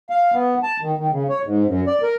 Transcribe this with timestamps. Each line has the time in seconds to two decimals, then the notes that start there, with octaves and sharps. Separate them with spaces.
0.10 F5
0.33 B3
0.63 A5
0.81 D#3
0.98 D#3
1.11 C#3
1.29 C#5
1.44 G#2
1.66 F#2
1.87 D5
2.03 A#4